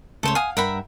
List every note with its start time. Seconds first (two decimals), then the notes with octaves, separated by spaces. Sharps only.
0.23 C#2 C#3 A3 A4 C5 C#5
0.35 F5 F#5 G#5 D#6
0.57 G2 A#4 E5 F#5 G5 B5